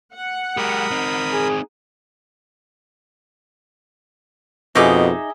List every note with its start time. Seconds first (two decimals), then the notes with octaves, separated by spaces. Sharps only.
0.14 F#5
0.57 G#3 G4 A#4 B5 D#6
0.91 C4 D#4
1.32 G#4
4.75 F2 B2 D#4 G#4 E5 D6 D#6